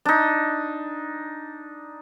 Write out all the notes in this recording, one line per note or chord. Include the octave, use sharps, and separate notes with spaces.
D4 D#4